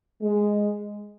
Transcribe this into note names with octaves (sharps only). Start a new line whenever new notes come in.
G#3